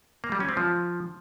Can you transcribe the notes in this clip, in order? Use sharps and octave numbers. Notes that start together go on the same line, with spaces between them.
A#3
G3
C#4
C4
F3